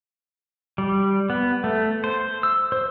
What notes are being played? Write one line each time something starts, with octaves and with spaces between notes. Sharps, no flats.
G3
B3
A3
C5
E6
C5